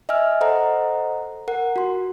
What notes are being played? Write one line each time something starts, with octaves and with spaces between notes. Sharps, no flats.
D#5 E5 G#5 E6 F6
A4 C5 D#5 F#5 A#5
A#4 F#5
F#4 C6